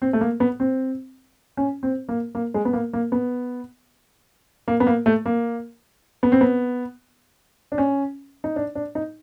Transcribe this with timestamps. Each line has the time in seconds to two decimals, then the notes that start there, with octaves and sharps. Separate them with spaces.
0.02 C4
0.13 A3
0.21 A#3
0.40 B3
0.60 C4
1.57 C#4
1.83 C4
2.09 A#3
2.35 A#3
2.54 G#3
2.65 B3
2.73 A#3
2.93 A#3
3.12 B3
4.68 A#3
4.80 B3
4.87 A#3
5.06 A3
5.26 A#3
6.23 B3
6.32 C4
6.41 B3
7.72 D4
7.78 C#4
8.44 D#4
8.56 D4
8.75 D4
8.95 D#4